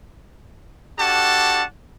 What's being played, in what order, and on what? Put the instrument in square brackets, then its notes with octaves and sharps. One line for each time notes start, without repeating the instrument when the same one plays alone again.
[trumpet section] D4 F#4 G4 A4 F#5 A5